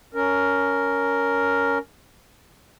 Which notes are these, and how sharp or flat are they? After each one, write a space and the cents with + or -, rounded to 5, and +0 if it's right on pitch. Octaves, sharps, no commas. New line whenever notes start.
C#4 +15 A#4 +0